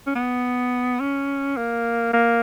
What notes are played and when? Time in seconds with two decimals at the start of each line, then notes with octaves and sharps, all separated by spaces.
0.07 C#4
0.15 B3
1.00 C#4
1.57 A#3
2.13 A#3